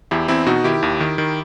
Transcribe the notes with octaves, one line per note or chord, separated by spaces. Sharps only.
E2 E4 G4
E2 C4 E4
B2 D#4 F#4
D#3 E4 G4
D#2
D#3
D#3